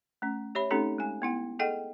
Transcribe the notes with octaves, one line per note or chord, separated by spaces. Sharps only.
A3 C#4
G4 C#5 E5 B5
A3 C4 C#4 D#4 G4 A4
G#3 G#5
B3 E4 F#5
G#4 A4 D#5 F#5 G5